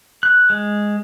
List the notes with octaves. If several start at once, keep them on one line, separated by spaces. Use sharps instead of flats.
F#6
G#3